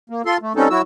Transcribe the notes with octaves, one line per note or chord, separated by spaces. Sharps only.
A#3
F4 A4 C6
A3
G3 C4 C#4 D#4 A4
F#3 E4 F#4 E6